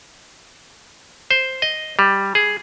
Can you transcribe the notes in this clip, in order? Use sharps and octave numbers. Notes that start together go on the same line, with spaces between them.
C5
D#5
G3
G#4